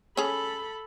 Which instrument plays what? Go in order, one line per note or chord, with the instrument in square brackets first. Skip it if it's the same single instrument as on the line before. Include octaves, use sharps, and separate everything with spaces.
[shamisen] C#4 G#4 [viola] A4 B5